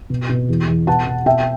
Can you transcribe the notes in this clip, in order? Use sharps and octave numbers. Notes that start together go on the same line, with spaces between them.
B2
B2
E2
E2
B2 F#5 A5
B2
B2 E5 G5